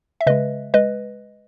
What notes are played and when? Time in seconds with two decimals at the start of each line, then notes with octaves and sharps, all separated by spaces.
0.21 E5
0.26 C#3 G#3 B4 D#5
0.74 G#3 B4 D#5